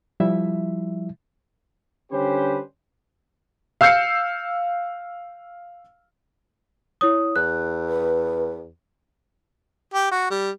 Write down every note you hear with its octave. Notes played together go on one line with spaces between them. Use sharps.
F3 G3 E4 E5
D3 G3 C#4 G4 B4 C5
F5 E6 F6 G6 C7 C#7
E4 C#5 D#6
E2 F#6
B4
G4
F#4
G3